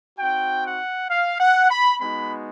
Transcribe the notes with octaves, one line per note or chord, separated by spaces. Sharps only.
C4 D#4 F#4 G5
F#5
F5
F#5
B5
G#3 B3 D#4 F#4 B5